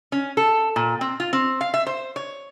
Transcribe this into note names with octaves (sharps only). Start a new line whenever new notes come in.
C#4
A4
A#2
C4
F4
C4
F5
E5
C5
C#5